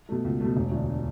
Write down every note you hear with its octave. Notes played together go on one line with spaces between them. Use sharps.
B2 A3
C#2
B2 A3
E1
D2 D3